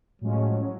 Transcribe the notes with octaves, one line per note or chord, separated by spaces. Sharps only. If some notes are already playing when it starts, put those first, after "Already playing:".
A2 F3 F#3 G#3 C#4